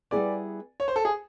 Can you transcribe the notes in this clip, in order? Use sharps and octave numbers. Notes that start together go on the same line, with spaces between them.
G3 B3 E4 G#4 B4 D5
C#5
C5
A4
G#4